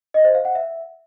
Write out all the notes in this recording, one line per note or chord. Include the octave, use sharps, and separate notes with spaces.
D#5
C5
F5
F#5
E5